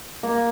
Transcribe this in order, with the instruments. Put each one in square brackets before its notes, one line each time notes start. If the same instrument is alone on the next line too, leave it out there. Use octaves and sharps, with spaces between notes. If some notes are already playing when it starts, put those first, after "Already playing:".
[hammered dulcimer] A#3